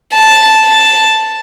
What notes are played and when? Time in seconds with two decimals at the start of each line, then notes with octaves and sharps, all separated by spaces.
0.13 A5
0.65 A5